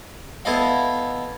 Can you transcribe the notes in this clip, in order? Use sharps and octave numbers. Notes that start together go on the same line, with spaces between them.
B3 E4 A4 D#5 F5